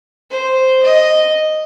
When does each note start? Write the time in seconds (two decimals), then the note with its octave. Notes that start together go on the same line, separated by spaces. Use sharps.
0.31 C5
0.83 D#5